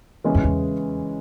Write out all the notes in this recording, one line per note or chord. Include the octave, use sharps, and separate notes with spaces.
C#3 E3 G#3 C#4
F#2
E2